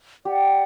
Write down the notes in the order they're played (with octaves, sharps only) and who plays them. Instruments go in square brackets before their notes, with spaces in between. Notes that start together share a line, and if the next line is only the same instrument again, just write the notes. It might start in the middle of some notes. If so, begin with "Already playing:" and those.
[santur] G4 [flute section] D5 F#5